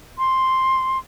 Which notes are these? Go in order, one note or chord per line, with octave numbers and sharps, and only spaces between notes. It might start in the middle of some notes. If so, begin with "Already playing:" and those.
C6